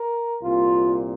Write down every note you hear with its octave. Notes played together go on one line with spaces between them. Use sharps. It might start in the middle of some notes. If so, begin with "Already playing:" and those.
Already playing: A#4
C2 A#2 F4